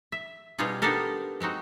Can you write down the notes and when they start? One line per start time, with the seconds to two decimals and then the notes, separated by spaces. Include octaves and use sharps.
0.12 E5
0.59 B2 G3 C4 D#4 F4 G#4
0.82 B3 D4 D#4 G4 A4 A#4
1.40 G#3 C4 D#4 F#4